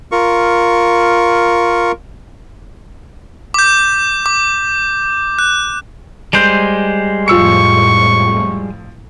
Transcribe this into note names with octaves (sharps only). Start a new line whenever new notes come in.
F4 A#4 C#6
D6 G6
D6
F#6
G3 G#3 C5 G6 D7
F2 A2 F3 C#6 E6 C#7